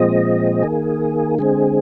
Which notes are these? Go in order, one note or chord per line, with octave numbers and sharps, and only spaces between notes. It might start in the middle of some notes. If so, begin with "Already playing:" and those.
Already playing: A#2 F3 G#3 C4 D#5
D#3 A#3 G#4
D3 G#3 C4 G#4